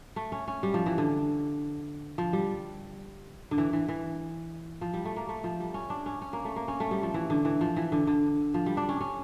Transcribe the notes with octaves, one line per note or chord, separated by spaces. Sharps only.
A3
C#4
C#4
G3
F3
E3
D3
F3
G3
D3
E3
E3
E3
F3
G3
A3
A#3
A3
F3
G3
C#4
D4
C#4
C#4
A#3
A3
A#3
C#4
A3
G3
F3
E3
D3
E3
F3
E3
D3
D3
F3
G3
D4
C#4
C#4